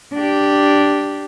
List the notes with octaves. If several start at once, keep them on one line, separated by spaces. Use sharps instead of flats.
D4 G4